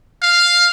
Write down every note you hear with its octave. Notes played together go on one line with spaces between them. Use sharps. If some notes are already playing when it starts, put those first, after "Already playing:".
F5